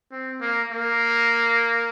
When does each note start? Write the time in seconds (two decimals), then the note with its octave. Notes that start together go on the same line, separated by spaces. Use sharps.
0.11 C4
0.41 A#3
0.72 A#3